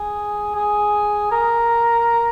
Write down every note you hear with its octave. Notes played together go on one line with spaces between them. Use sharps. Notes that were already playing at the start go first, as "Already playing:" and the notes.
Already playing: G#4
G#4
A#4